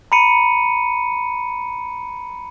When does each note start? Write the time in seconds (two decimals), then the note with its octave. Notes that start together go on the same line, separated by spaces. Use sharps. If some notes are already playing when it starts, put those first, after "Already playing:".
0.12 A#5 B5 C#7 D#7